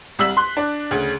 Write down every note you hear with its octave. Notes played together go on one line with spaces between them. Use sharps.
C2 G3 E6 B6 F#7
C6 F#6
D4 D5
D2 C#3